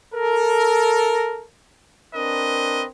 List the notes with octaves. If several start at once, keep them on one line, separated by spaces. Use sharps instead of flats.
A4 A#4
C4 D4 A#4 B4 D#5